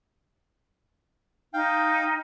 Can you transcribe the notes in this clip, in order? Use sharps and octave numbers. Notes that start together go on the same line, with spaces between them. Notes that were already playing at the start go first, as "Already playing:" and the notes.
D#4 F5 G5